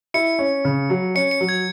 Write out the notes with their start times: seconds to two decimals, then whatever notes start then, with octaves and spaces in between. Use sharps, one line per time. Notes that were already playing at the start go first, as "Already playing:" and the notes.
0.14 E4 C#7
0.39 C#4
0.65 C#3
0.90 F#3
1.15 C#4 C#7
1.31 C#7
1.41 F#3
1.49 G#6